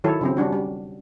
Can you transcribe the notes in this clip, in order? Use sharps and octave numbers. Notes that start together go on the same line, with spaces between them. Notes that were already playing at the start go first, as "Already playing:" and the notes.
D#3 F#3 E4 A4 C#5
C#3 F#3 C4
G3 C#4 D4 F#4
G3